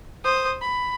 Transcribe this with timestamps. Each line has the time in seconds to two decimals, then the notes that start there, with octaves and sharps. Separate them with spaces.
0.24 C5 D#6
0.61 B5